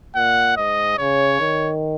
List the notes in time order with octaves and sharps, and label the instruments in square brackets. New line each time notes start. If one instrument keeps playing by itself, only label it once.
[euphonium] A#2 [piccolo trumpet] F#5
[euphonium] G#2 [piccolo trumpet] D#5
[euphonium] C#3 [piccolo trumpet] C#5
[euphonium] D#3